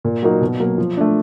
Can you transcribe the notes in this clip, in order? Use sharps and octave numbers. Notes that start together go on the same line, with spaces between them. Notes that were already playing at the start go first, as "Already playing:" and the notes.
A#2
F#3 A#3 D#4 F#4
B2
F#3 A#3
F3
A3 D4